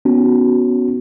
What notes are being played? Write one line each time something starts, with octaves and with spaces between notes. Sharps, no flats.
B3 C#4 D#4 F#4